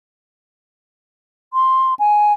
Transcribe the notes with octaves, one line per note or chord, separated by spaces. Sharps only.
C6
G#5